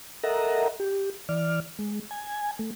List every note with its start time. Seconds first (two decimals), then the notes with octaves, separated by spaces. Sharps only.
0.23 A4 A#4 D#5 E5 F#5 A#5
0.80 G4
1.29 E3 D5 F6
1.79 G#3
2.11 G#5
2.59 A3